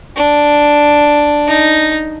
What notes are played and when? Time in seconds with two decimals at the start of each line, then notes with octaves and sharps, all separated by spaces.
0.17 D4
1.47 D#4